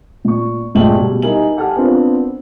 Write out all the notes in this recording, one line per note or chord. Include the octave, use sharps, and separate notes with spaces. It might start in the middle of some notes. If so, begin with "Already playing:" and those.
A#2 C#6
G1 A#2 G#3 A3 G5 F#7
B2 G3
G3 D#4 E4 A#4 G#5 F#7
G4 A4 F#5 G#5 A5 F6
B3 C4 D4 F4 A#4